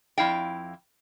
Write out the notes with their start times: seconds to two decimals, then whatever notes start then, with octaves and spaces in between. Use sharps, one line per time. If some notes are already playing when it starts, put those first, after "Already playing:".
0.18 F2 E4 F5 G5